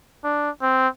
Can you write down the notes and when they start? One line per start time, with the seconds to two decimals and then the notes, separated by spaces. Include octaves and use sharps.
0.24 D4
0.62 C4